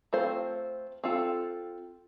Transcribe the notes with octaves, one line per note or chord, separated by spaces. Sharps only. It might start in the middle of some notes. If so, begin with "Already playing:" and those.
A3 C4 F4 C5
C4 F4 A4